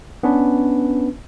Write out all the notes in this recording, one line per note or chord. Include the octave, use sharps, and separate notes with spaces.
B3 C#4 D4 B4